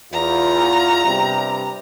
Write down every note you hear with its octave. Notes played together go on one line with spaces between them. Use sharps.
E2 F4 A#5
G2 C3 G3